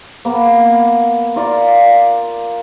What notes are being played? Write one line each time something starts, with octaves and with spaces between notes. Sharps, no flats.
A#3 B3
F4 A#4 D5 F5